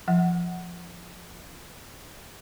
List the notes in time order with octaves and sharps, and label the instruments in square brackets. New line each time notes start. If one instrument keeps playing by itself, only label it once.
[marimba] F3 F#5